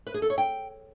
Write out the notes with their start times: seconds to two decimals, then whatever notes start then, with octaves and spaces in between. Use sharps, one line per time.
0.07 B4
0.14 G#4
0.22 A4
0.30 C#5
0.38 G5